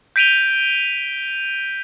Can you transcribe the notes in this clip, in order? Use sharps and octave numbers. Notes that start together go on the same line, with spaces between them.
G6 B6 D7 D#7 F7 G7